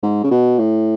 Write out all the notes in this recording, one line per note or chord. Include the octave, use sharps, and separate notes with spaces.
G#2
C#3
B2
A2